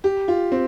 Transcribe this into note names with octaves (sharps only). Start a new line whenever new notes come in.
G4
F4
C4